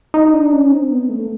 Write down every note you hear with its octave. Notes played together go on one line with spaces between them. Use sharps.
D#4
D4
C#4
C4
B3
A3